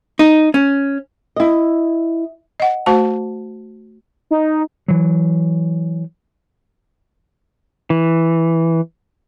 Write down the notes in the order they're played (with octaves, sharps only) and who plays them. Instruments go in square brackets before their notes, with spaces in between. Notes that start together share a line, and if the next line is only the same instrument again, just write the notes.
[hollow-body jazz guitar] D#4
C#4
[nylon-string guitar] E4 D#5
[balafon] D#5 F#5
A3 F#4 C5 A5
[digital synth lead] D#4
[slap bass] E3 F#3
[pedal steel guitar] E3